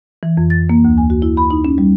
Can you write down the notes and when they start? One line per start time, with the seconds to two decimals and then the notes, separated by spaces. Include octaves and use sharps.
0.23 E3
0.37 F2
0.50 A6
0.70 A#3
0.85 D2
0.98 G#5
1.10 F#4
1.22 E4
1.37 B5
1.51 D#4
1.65 C#4
1.78 G3